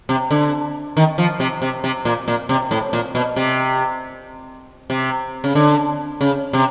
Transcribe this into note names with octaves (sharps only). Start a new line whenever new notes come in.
C3
D3
D#3
F3
C3
C3
C3
A#2
A#2
C3
A2
A#2
B2
C3
C3
C#3
D3
C#3
C3